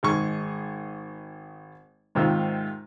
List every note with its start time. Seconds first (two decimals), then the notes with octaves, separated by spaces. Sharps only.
0.03 G#1 G#3 G#4 C#6
2.15 G#2 C3 D#3 F4 E6